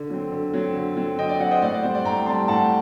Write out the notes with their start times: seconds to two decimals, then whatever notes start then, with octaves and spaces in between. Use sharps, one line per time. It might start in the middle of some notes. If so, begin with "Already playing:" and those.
Already playing: D3
0.10 F#3 C4
0.32 D3
0.54 F#3 C4
0.75 D3
0.97 F#3 C4
1.18 D3 D#5 G5
1.29 D5
1.40 F#3 C4 D5 F#5
1.51 C5 D#5
1.61 A2 D5 F#5
1.72 D5
1.83 G3 C4 C5
1.95 D5
2.05 A2 G5 A#5
2.26 G3 C4 A5 C6
2.48 A2 F#5 A5